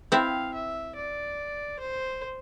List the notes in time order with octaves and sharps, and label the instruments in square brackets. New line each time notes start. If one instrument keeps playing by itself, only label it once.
[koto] C4 E4 [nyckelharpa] F5
[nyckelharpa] E5
D5
C5